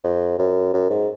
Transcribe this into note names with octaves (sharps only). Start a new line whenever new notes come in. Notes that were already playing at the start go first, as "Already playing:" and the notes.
F2
F#2
F#2
G#2